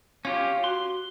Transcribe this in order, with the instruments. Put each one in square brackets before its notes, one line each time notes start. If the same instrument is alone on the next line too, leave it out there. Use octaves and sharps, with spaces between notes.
[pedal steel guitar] C#4 F4 G4 [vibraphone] F5
[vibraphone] F#4 [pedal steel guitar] C6